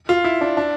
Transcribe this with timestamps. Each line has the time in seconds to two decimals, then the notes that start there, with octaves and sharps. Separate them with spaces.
0.09 F4
0.24 E4
0.41 D4
0.57 D4